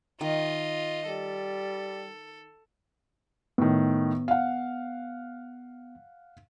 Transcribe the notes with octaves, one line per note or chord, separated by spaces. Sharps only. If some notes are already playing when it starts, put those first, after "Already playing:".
D#3 F4 D#5
G3 A4
A2 D#3 B3
F5 F#5